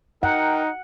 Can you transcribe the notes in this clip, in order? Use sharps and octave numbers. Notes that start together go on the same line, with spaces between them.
D#4 A#4 F#5 G5